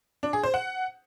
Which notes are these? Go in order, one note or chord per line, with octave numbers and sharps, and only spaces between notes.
D4
G#4
C5
F#5